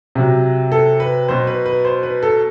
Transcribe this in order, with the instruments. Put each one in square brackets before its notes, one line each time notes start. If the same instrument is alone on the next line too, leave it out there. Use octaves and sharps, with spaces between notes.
[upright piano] C3 F#3
A4
B4
B2 F#3 C5
B4
B4
C5
B4
A4